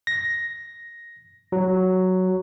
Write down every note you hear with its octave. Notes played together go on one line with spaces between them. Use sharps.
A#6
F#3